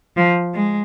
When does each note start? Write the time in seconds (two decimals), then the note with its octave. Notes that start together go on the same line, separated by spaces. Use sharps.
0.17 F3
0.54 G#3